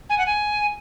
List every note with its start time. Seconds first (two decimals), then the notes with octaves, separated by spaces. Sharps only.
0.10 G#5
0.18 F#5
0.26 G#5